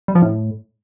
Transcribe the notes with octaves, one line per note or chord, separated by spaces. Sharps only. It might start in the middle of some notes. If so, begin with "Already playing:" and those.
G3
F3
A2